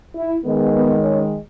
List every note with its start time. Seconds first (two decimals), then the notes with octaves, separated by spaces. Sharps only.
0.16 E4
0.44 D#3 G#3 B3
0.73 B3
1.01 C#4